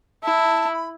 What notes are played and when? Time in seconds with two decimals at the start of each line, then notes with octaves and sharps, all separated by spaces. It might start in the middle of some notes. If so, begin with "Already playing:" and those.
0.23 E4 A5
0.73 B5